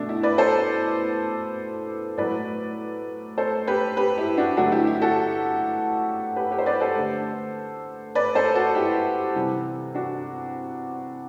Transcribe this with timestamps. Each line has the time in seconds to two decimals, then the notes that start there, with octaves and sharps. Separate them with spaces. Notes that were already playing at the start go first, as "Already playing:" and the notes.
Already playing: B2 A3 D4
0.09 E4
0.23 B4 D5
0.38 A4 C5
2.18 A2 F#3 A3 B4 D5
3.38 A4 C5
3.67 G4 B4
3.97 G4 B4
4.18 E4 G4
4.37 D4 F#4
4.57 D3 F#3 A3 D4 F#4
4.72 E4 G4
4.87 E4
5.01 F#4 A4
6.36 G4 B4
6.51 G4 B4
6.58 C5
6.66 B4 D5
6.81 A4 C5
6.96 D3 A3
8.15 B4 D5
8.35 A4 C5
8.55 F#4 A4
8.75 E4 G4
9.35 C3 E3 G3
9.94 D4 F#4